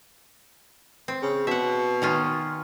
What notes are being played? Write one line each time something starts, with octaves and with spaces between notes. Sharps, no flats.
C4
C#3
B2 E5 F#5
D#3 C#4 F4